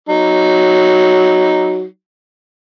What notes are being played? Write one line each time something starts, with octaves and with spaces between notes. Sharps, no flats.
F#3 D#4